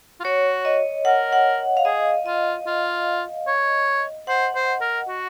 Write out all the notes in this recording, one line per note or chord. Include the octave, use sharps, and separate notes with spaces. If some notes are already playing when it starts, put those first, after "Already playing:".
F4
F#4 C#5
D#5
A#4 F#5
F#5
F5
G#4 D#5
F4 D#5
F4
C#5
C5 F#5
C5
A#4
F#4